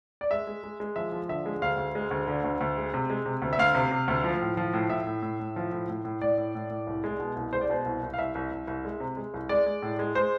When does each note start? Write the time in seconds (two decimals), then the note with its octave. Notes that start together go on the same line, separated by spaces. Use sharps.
0.21 D5
0.31 G#3 E5
0.47 G#3
0.64 G#3
0.80 G#3
0.96 F3 E5
1.12 F3
1.29 D3 E5
1.46 G#3
1.62 D2 F5
1.78 D2
1.95 G#3
2.11 D2
2.27 D3
2.44 D2
2.61 D2
2.77 G#3
2.94 C3
3.10 G#3
3.26 C3
3.42 D2
3.53 E5
3.59 D2 F5
3.75 C3
3.91 C3
4.08 D2
4.24 F3
4.41 A2
4.57 F3
4.74 A2
4.90 A2 E5
5.07 A2
5.22 A2
5.40 A2
5.56 F3
5.72 A2
5.89 A2
6.05 A2
6.21 A2 D5
6.38 A2
6.55 A2
6.70 A2
6.87 C2
7.04 G#3
7.20 B2
7.36 C2
7.53 G#3 C5
7.61 D5
7.70 B2 C5
7.85 C2
8.02 C2
8.14 F5
8.18 C2 E5
8.35 C2
8.52 C2
8.67 C2
8.85 G#3
9.00 C3
9.17 G#3
9.34 C2
9.49 G#3 D5
9.66 G#3
9.82 A2
9.99 G#3
10.15 G#3 C5